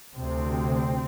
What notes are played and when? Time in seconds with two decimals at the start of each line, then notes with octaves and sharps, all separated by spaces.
0.15 D2 C3 C4